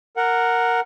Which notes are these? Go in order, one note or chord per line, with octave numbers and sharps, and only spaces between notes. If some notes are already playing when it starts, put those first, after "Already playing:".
A#4 F#5